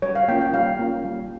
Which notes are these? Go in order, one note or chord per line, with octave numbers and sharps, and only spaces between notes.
G3 C#5
F5
A#3 C#4 F4 G5
G5
G3 F5
A#3 C#4 F4
G3